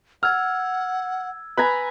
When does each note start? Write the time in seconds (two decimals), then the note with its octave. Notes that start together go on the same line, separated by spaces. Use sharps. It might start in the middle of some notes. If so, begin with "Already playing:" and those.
0.23 F#5 E6 F6 G#6
1.57 B4 G#5 A#5 B5